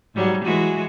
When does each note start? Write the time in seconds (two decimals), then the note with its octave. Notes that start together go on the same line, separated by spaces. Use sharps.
0.15 G#2 F#3 G3
0.45 E3 G#3 F#4